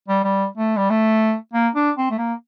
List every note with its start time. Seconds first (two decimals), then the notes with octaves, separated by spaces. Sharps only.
0.08 G3
0.24 G3
0.57 A3
0.77 G3
0.90 A3
1.54 A#3
1.76 D4
1.98 C4
2.11 A3
2.18 A#3